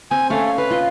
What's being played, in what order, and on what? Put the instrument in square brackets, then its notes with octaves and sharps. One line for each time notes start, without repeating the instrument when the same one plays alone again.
[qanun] C4 [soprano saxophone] G#5
[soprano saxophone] A3 [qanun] C#4 F5
[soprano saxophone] B4 [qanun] F5
[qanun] F4 D#5